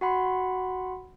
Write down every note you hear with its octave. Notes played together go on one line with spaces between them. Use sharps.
F#4 F#5 B5 C6